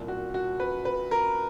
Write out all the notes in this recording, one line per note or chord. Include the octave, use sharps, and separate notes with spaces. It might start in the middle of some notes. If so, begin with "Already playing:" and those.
Already playing: C2 A#2
F#4
F#4
B4
B4
A#4